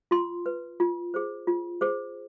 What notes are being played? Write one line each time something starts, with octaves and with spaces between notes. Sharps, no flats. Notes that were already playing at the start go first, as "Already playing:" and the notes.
F4 C6
B4
F4
G#4 C5
F4
G#4 C5